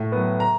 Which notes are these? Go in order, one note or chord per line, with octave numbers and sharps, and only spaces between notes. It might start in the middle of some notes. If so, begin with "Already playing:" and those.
Already playing: A2
F#3 B3
A#5